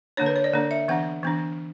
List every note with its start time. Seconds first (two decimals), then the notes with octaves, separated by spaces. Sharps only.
0.17 D3 A#3 D4 C#5
0.26 B4
0.36 C#5
0.44 D5
0.53 D3 A#3 D4
0.71 E5
0.88 E3 B3 D4 F#5
1.23 E3 B3 D4